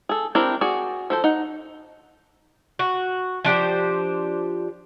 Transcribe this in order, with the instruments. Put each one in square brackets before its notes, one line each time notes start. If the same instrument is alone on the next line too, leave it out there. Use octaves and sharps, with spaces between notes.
[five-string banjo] G#4 A4
C4 D4 E4 G4 A#4
F#4 G#4 D5
F3 A4 C5
D#4 F#5
[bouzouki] F#4
F3 D4 G4 C5